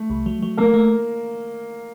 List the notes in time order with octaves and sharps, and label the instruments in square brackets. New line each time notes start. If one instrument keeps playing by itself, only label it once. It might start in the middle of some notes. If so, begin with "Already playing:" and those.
Already playing: [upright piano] A3
[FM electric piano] C2
F#3
F#3
[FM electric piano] A3 [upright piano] A#3 A#4
[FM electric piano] A3